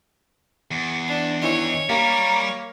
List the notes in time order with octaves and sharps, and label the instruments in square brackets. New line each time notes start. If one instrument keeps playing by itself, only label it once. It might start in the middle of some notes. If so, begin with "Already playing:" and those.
[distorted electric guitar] E2
[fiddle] D4
[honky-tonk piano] D#3 E3 [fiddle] C#5
[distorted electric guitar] G3 [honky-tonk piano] A#3 [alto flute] A#5